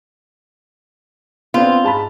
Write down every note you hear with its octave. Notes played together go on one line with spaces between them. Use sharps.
B3 C4 D4 F4
G#2 A5 B5